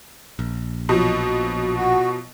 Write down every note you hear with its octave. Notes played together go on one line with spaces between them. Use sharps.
A#1
B2 F3 F#3
F#4